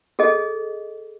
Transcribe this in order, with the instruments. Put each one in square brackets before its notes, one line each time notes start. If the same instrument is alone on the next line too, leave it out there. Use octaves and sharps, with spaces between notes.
[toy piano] G#4 A4 D#5